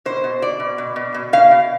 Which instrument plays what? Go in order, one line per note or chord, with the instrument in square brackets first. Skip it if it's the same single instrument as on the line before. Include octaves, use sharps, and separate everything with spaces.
[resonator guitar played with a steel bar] B2 C5
B2
B2 D5
B2
B2
B2
B2
B2 F5
B2